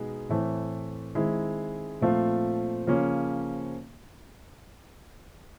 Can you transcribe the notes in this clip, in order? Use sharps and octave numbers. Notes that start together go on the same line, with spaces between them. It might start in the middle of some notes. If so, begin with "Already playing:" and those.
Already playing: B2 G#3 B3 D#4
A2 E3 A3 C4
D#3 G#3 C4 E4
A#2 F3 A3 C4 F4
C#3 F3 A#3 C#4